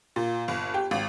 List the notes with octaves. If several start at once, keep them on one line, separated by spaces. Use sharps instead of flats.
A#2
G1
G4
G#1